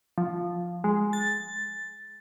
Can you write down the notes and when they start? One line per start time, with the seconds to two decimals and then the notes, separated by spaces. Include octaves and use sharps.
0.18 F3
0.84 G#3
1.13 A6